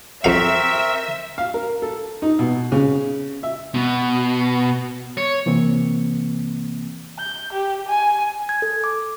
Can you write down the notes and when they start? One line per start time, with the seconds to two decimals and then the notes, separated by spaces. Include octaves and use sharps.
0.24 F2 C4 A#4 E5 F5 C#6
1.38 F5
1.54 A#4
1.82 A4
2.22 D#4
2.39 B2
2.72 C#3
3.43 E5
3.74 B2
5.17 C#5
5.46 C3 E3 A#3 C4
7.18 G6
7.53 G4
7.88 G#5
8.49 G#6
8.62 A4
8.84 D6